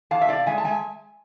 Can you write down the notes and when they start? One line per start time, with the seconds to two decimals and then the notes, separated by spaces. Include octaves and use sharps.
0.11 E2 F5 A5
0.22 E5
0.28 C3 D5 F5
0.46 G#3 E5 G#5
0.58 A5
0.64 G#3 E5 G#5